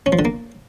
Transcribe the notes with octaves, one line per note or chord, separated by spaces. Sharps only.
C#4
F3
D3
A#3